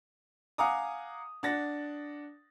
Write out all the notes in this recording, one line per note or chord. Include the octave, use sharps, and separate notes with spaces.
F5 F#5 G#5 A#5 D6 D#6
D4 F#5 A6 A#6